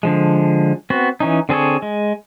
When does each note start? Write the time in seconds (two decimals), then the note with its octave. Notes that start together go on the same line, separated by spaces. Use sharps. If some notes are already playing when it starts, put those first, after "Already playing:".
0.03 D3 F3 G#3
0.90 B3 C4 F#4
1.20 E3 C#4 D#4
1.49 D3 C4 G#4 A4 C#5
1.82 G#3